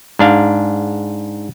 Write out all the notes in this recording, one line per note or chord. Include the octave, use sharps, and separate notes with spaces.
G#2 D4 F5